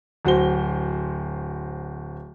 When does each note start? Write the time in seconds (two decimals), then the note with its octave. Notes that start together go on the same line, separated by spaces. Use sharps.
0.25 D1 F#4 C5 G7